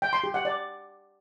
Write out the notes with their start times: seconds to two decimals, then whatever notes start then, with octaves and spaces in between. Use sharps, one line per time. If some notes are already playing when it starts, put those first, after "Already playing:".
0.02 G5
0.13 C6
0.24 G4
0.34 F#5
0.45 D5